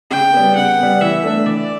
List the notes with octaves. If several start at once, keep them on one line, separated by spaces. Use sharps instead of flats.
C#3 G5
G3 B3
C#3 F#5
G3 B3
E3 E5
A3 D4
E3 D5